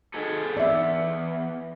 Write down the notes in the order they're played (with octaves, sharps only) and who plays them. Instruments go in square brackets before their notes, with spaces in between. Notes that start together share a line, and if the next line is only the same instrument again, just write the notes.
[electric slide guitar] D#4 G#4 A4
[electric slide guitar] E2 [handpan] D5 E5